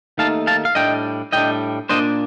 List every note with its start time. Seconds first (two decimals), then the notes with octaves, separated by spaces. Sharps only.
0.18 D#2 D#3 A3 D#4 F5 A5
0.47 F5 A5
0.65 F5
0.75 A2 G3 D4 D#5 G5
1.32 A2 G3 D4 D#5 G5
1.89 A#2 F3 A#3 D4 C5 D#5